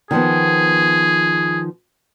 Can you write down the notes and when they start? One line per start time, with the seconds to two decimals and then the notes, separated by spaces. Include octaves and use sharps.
0.11 D#3 F3 B3 G#4